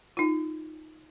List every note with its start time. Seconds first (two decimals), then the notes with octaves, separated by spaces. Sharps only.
0.17 D#4 F4